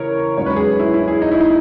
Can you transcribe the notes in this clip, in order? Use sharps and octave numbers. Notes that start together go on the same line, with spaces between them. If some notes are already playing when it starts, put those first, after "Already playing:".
Already playing: C#3 E3 A#4 C#5
G#2 F#3 C#4 C#5
B4
G#4
E4
E4
G#4
D#4
E4
D#4